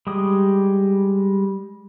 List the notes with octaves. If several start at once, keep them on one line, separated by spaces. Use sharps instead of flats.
G3 G#3 D#6